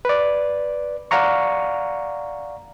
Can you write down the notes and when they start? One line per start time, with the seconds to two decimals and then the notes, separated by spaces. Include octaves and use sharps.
0.05 B4 D5
1.11 D5 F5 F#5 A#5 C#6